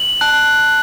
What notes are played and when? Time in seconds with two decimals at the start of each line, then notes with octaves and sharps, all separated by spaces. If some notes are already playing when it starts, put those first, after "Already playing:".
Already playing: F#7
0.21 A5 F#6